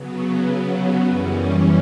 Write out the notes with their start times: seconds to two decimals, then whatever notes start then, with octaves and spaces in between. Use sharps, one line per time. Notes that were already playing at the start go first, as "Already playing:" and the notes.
Already playing: C#3 F#3 B3
1.08 F#2 E3 G3 C#4